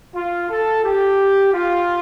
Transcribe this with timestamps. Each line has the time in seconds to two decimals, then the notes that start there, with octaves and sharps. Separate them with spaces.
0.16 F4
0.50 A4
0.84 G4
1.53 F4